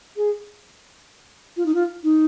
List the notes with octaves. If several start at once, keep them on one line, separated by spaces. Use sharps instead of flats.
G#4
F4
D#4
F4
D#4